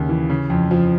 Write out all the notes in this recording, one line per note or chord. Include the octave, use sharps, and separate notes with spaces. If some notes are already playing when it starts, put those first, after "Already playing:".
Already playing: D#2 C#3
E3
C#3
F2
F3